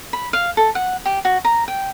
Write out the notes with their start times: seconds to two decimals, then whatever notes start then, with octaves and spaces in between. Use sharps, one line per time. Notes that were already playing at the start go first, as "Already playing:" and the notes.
0.13 B5
0.33 F5
0.57 A4
0.75 F#5
1.05 G4
1.25 F#4
1.45 A#5
1.68 G5